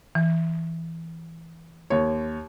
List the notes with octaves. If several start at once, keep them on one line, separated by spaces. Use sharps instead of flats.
E3
D#2 C#5